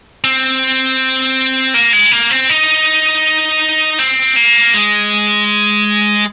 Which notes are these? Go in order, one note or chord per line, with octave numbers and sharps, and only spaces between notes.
C4
A#3
G#3
A#3
C4
D#4
C4
A#3
G#3